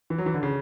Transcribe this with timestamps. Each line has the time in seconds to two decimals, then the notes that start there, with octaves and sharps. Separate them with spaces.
0.10 E3
0.18 F#3
0.26 E3
0.34 D3
0.43 C#3